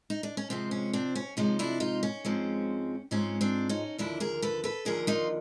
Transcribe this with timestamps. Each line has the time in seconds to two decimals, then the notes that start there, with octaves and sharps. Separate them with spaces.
0.10 D#4
0.23 D4
0.37 C#4
0.50 C3 F3 G#3 C4
0.71 C#4
0.93 C4 D4
1.15 C#4
1.37 C3 F3 G#3 C#4 D#4
1.59 D4 E4
1.80 D#4 F4
2.03 C#4
2.25 G#2 F3 G#3 C4
3.11 G#2 F3 G#3 C4 C#4
3.41 C4 D4
3.69 C#4 D#4
3.98 D#2 D3 F3 D4 E4
4.20 G#4 A#4
4.42 A4 B4
4.64 A4 B4
4.85 D#2 D3 F3 G#4 A#4
5.07 D#4 F4